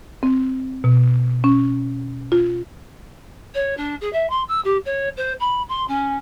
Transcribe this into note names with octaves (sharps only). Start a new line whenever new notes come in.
C4
B2
C#4
F4
C#5
D4
G#4
E5
C6
E6
G4
C#5
C5
B5
C6
C#4